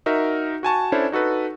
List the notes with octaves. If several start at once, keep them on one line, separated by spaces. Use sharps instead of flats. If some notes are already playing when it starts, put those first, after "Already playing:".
D#4 F#4 A#4 E5
F#4 G#5 A5 C#6
C#4 D4 E4 A4 C5 C#5
D#4 F#4 A4 B4